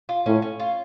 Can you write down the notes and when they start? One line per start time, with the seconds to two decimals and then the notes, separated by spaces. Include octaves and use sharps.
0.09 F4
0.26 A2 C#4
0.42 C#4
0.60 F4